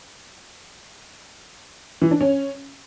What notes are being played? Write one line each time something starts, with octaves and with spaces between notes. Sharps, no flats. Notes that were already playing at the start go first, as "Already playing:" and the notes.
E3
D4
C#4